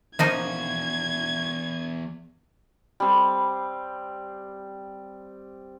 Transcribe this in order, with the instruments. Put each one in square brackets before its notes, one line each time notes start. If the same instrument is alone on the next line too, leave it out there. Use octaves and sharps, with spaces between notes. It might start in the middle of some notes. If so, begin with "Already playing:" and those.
[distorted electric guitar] E2 F#4 [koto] F3 A#3 D#4 [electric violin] G#6
[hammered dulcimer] G3 C4